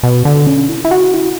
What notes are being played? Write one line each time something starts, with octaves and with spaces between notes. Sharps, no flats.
B2
D3
C#4
E4
E4
F#4
E4